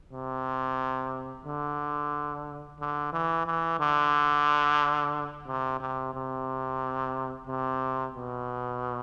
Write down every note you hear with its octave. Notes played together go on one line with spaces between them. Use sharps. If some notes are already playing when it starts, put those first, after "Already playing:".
C3
D3
D3
E3
E3
D3
C3
C3
C3
C3
B2